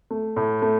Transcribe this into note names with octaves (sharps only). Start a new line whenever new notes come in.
A3
A2
A3